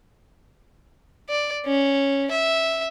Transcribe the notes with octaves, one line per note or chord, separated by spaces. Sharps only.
D5
C#4
E5